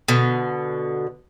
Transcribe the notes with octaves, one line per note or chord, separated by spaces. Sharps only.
B2 D3